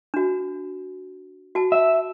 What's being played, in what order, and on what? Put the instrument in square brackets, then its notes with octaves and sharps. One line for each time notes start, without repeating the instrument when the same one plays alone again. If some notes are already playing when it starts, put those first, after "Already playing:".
[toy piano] D4 F#4
F#4 A5
[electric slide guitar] E5